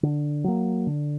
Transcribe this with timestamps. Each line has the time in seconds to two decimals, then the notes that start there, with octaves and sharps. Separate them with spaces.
0.03 D3
0.44 F#3 A#3
0.87 D3